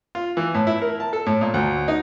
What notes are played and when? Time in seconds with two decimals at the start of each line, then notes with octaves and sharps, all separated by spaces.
0.15 F4
0.37 E3
0.54 A2
0.67 E4
0.82 A#4
1.00 A5
1.13 A4
1.26 A2
1.41 A#2
1.54 D2
1.88 D#4